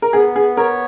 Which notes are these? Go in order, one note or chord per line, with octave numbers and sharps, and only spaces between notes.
A#4
B3 G#4
G#4
A#4 C#5